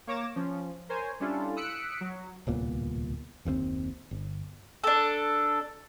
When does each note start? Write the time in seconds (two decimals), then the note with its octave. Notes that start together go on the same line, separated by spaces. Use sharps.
0.07 A#3 C#5 D6 A#6 E7
0.36 F3 C#4
0.89 A#4 C5 C#5 G#5
1.20 G3 C#4 D4 E4 F4 A4
1.56 D#6 E6 F#6 B6 C#7 D7
2.01 F#3
2.47 D1 C2 A#2 B3
3.45 F#1 D#2 C#3 C4
4.11 G1
4.84 D4 A4